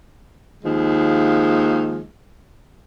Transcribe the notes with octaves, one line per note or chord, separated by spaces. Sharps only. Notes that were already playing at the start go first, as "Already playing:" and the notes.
D#2 F3 G#3